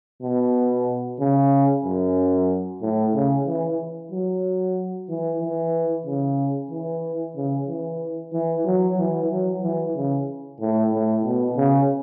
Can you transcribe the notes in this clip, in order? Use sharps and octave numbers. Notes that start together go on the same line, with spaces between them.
B2
C#3
F#2
A2
C#3
E3
F#3
E3
E3
C#3
E3
C#3
E3
E3
F#3
E3
F#3
E3
C#3
A2
A2
B2
C#3